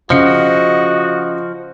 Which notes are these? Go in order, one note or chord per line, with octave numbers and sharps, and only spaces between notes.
C#3 F3 F#4 D#5 C#7